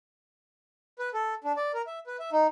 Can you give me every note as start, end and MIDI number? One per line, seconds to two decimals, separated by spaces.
0.99 1.09 71
1.14 1.34 69
1.44 1.52 62
1.57 1.72 74
1.74 1.82 70
1.87 1.99 76
2.07 2.17 71
2.19 2.30 76
2.33 2.47 63